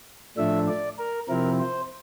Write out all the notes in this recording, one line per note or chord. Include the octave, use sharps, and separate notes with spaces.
A2 F3 A3 D4 E5
D5
A#4
C3 F3 C4 E4 A#4
C5